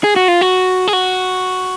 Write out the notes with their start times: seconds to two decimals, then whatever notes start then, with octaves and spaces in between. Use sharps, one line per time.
0.04 G#4
0.16 F#4
0.28 F4
0.41 F#4
0.88 G#4
0.93 F#4